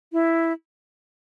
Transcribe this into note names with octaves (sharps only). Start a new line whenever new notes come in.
E4